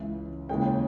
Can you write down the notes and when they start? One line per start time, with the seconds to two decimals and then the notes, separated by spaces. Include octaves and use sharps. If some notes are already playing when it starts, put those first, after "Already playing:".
Already playing: C#2 C#3 E3 E5
0.49 D#2 C#3 E3 G#3 C#4 G5